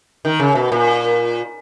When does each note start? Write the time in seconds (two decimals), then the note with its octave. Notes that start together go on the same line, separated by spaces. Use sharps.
0.25 D#3
0.40 C#3
0.55 B2
0.72 A#2